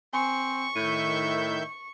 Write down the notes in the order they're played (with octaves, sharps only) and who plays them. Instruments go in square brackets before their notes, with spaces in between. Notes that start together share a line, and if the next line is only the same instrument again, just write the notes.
[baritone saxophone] C4 [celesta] G#5 [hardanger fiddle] C#6
[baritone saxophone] A2 [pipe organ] D#3 E5 G6 [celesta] D#7